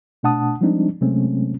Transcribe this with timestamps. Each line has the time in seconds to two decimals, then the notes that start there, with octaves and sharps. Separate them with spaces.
0.23 B2 A3 D4 F#5 A5 D#6
0.61 F3 G3 G#3 C4 D4 D#4
1.01 C3 F#3 G#3 A3 C4 C#4